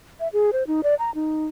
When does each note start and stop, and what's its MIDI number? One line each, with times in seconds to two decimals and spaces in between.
0.20 0.28 76
0.33 0.50 68
0.53 0.63 72
0.67 0.81 63
0.83 0.94 74
0.99 1.11 82
1.15 1.46 63